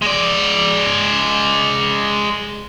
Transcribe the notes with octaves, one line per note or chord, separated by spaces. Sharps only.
G#3 D5